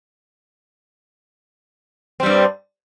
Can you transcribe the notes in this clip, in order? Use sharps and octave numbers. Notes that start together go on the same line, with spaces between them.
G2 G3 C4